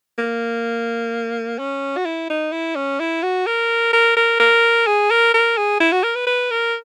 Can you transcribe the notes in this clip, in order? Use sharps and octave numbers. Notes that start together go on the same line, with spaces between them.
A#3
C#4
F#4
E4
D#4
E4
C#4
E4
F#4
A#4
A#4
A#4
A#4
G#4
A#4
A#4
G#4
E4
F#4
A#4
B4
B4
A#4